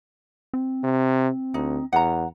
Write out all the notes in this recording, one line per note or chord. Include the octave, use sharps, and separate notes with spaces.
C4
C3
D2 D#4
E2 F#5 A#5